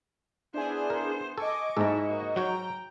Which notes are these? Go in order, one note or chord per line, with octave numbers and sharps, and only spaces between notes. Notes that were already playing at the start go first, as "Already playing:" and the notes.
B3 D4 E4 G#4 C5
A#4
A4 D#5 G#5 C#6 D6
G#2 E4 A4 A#5
A#3 F#4
F#3 F#4 C#5 G5 A#5